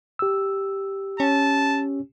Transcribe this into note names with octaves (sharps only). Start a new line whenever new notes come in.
G4 E6
C#4 A5